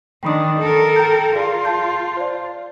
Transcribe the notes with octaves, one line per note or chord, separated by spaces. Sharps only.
D#3 D4 G5 B5 D#6
A4 A#4
G5 A#5 G6
F4 G#4 D5
A5 C6 G6
C5 D5